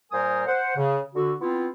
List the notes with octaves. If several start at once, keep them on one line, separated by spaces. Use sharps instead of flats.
A#2 G3 A#4 C5 G#5 D#6
C5 F#5
C#3
D3 F#4
B3 C4 E4 F4